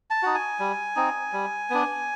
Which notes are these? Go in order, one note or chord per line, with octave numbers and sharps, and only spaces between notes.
A5
D#4 F#4
G#5
G3
C4 D#4
G3
B3 D4